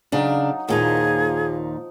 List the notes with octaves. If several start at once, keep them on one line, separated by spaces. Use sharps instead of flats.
C#3 F#3 D4 D#4 F5
D#2 A#2 F3 D#4 G#4